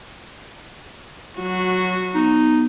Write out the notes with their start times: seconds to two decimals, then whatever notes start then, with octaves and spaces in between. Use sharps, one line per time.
1.38 F#3 F#4
2.15 B3 D#4